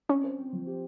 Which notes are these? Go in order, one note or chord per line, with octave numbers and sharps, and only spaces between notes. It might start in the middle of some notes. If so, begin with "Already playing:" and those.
C4 C#4
C5
C4
F3
G4